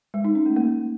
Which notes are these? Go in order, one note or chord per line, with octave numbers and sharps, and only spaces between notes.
G#3
D#4
C#4
A3
A#3